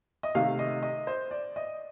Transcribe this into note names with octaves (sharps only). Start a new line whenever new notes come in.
D#5
C3 D#3 A3 F5
D#5
D#5
C5
D5
D#5